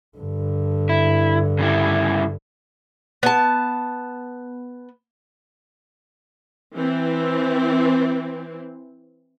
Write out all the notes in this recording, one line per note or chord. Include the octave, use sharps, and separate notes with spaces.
G2 D3
E4
C#3 G3 E4
B3 A5
E3 C4